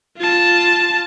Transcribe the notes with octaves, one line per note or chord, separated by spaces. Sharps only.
F4 A5